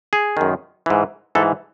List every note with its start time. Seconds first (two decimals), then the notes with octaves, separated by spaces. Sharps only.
0.13 G#4
0.37 F#2 D#3
0.86 G#2 E3
1.35 G#2 E3 A4